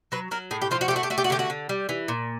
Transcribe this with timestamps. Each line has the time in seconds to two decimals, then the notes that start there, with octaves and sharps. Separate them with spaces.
0.12 F#3 B4
0.31 F#3 A#4
0.51 A2 G#4
0.62 G4
0.71 F3 F4
0.81 F#4
0.88 A3 G4
0.96 F#4
1.03 G4
1.10 A3 F#4
1.18 G4
1.24 F#4
1.30 D3 G4
1.39 F#4
1.50 D3
1.69 G3
1.89 E3
2.08 A#2